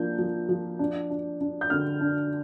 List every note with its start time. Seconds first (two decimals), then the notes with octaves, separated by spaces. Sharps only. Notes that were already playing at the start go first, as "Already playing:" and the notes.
Already playing: F3 A#3 D4 G6
0.19 F3
0.49 F3
0.79 D4
1.10 D4
1.41 D4
1.61 G6
1.70 D3 F6
2.00 D4